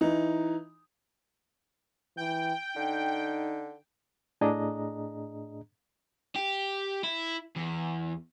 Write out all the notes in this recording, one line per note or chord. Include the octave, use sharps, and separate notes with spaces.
E3 D#4
E3 G5
D3 D#4
A2 D4 G#4 D#5 A#5
G4
E4
E2